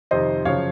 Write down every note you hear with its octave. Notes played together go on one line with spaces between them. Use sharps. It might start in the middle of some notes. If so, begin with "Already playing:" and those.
F2 C3 D#3 C5 D#5
F#2 C#3 F3 C#5 F5